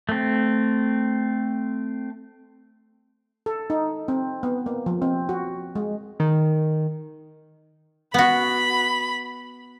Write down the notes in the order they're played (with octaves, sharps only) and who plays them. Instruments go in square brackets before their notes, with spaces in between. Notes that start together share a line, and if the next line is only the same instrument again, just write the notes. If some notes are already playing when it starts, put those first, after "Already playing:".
[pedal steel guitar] A3 C4
[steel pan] A4
D#4
C4
B3
A#3
F3
C4
F#4
G#3
[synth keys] D#3
[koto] B3 F#4 [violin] B5